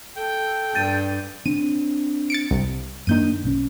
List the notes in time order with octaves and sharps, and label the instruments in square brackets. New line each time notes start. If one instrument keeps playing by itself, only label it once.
[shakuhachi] A4 [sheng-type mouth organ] G5
[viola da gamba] G2 [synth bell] G6 A6 D#7
[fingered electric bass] C4 D4 [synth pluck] D#7
[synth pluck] A6 C#7 D7
C2
[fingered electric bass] F#2 A#3 D4 [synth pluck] D#3 G6 D#7
[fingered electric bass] B1 C#4